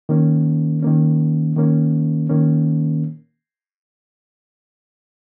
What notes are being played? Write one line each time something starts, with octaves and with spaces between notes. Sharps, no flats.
D#3 A#3 C#4
D#3 A#3 C#4
D#3 A#3 C#4
D#3 A#3 C#4